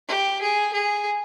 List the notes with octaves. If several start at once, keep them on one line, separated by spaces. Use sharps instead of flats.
G4
G#4
G#4